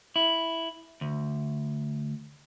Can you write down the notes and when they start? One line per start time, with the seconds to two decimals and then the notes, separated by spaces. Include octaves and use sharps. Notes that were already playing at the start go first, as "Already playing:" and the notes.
0.16 E4
1.01 D2